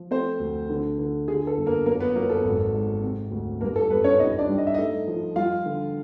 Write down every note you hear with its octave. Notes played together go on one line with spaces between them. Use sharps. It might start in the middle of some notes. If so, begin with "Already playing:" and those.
Already playing: F3
A3 C4 C5
D2
D3
D3
D3 G#4
A4
G1
A#3 A#4
F#2 A#3 A#4
B3 B4
F#2 A#3 A#4
A4
G#1
G#2
C3
D2
G2 A#3 A#4
A4
G2 B3 B4
C#4 C#5
C2 D#4 D#5
D4 D5
G3
D#5
E5
A3 D#4 D#5
F3
G3 F4 F5
D3